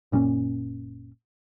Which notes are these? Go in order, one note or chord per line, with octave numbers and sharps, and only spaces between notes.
F#1 A#2 C4 C#4